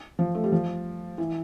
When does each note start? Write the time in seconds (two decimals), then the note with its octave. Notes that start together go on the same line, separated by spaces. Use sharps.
0.19 F3
0.35 A3
0.44 G3
0.52 F3
1.18 E3